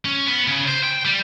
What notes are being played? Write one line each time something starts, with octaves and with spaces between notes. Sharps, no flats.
C#4
B3
C#3
C5
G5
G3